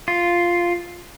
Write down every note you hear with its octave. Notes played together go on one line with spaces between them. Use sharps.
F4